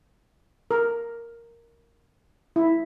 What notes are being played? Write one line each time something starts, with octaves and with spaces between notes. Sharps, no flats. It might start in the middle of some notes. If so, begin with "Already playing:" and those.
A#4
E4